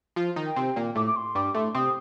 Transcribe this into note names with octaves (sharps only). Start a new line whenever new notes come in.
F3 F4
D#3 D#4
G5
C3 C4
A#2 A#3
A2 A3 D6
D6
C6
G2 G3 D6
A2 A3 C6
C3 C4 D#6